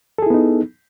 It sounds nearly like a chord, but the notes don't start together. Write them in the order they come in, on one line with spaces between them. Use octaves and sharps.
A4 G#4 E4 B3 D#4